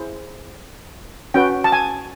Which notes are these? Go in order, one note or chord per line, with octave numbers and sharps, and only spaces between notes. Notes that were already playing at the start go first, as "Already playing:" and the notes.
Already playing: E4 G#4 C5
C#4 F#4 B4 G5
A5
G#5